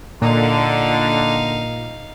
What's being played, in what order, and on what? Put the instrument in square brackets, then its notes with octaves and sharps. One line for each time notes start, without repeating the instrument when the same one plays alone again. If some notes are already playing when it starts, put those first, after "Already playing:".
[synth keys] A#2 [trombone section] D3 [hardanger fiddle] D#4 F5